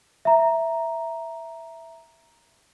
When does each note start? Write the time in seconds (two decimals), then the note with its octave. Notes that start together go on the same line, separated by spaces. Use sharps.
0.25 E5 A#5